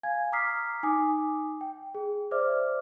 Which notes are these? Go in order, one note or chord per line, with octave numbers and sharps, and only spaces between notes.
F5 G#5 G#6
A#5 D6 D#6 F6 B6 C7
D#4 G#5 D6 D#6
G5
G#4
C5 D5 E5 D6 F6